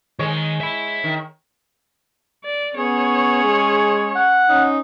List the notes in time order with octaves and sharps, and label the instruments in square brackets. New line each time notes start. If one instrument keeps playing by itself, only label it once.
[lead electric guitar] D#3 [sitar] G#3 C#5
[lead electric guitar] E5 B5
[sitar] D#3
[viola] D5
[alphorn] B3 [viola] C#4 C#5 [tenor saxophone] G#4
[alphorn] G#3
[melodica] F#5
[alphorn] C#4 [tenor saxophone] D#4